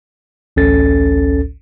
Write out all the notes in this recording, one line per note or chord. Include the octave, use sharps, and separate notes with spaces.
A1 D2 C#4 A4 A6